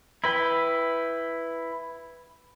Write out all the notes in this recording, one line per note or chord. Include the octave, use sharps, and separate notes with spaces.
E4 B4 G5